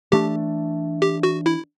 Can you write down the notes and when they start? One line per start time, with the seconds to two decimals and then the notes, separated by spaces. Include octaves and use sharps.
0.12 E3 A3 D4 G4
1.02 G4
1.23 F#4
1.46 E4